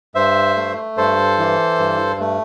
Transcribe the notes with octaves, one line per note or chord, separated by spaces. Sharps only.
G2 C5 E5
A3
G2 A4 C5
E3
G2
A3